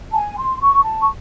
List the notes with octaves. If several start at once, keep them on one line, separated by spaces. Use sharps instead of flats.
A5
G#5
C6
C#6
A5
C#6